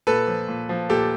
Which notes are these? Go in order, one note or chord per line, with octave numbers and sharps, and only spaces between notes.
A#2 A4 B4
F3
A#2
F3
A#2 G4 A4